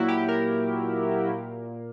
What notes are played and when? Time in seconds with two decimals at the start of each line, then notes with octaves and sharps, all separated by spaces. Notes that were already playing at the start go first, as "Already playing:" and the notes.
Already playing: A#2 F#3 A#3 E4 F#4
0.08 G4
0.29 A#4
1.28 A#2 A#3